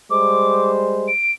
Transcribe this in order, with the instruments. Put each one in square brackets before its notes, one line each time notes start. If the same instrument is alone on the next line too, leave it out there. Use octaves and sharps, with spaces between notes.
[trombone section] G3 G#3 C5 [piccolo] D6
[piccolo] D7